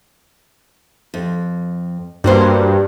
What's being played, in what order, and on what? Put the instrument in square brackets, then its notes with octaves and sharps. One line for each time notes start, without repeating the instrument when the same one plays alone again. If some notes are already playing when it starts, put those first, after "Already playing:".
[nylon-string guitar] F2
[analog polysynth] G2 [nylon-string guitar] A#3 F#4 C5